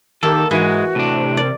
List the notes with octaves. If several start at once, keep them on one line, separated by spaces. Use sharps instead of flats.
D#3 A#3 G4 A4
G#2 E3 G#3 F#4
A2 C3 D4
A#4 D5